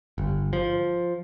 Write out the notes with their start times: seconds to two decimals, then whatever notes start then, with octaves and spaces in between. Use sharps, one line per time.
0.18 G1
0.53 F3